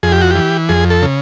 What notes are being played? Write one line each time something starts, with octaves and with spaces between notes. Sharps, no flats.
F2 G#4
G4
F#4
E3 G4
F2 G#4
A4
C#3